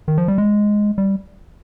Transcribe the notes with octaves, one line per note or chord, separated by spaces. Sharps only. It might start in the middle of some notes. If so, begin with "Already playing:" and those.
D#3
F3
G3
G#3
G3